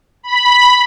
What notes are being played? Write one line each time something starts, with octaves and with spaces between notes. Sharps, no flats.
B5